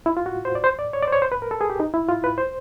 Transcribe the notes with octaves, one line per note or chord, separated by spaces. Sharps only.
E4
F4
F#4
C5
D5
C5
D5
C#5
D5
C5
C#5
C5
B4
A#4
A4
G#4
G4
D#4
E4
F4
B4
C5